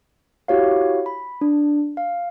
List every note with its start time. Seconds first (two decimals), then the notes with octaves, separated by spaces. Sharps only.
0.48 E4 F#4 G4 C#5 F5
1.06 B5
1.41 D4
1.97 F5